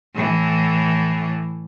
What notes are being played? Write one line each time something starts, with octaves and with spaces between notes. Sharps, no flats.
A2 E3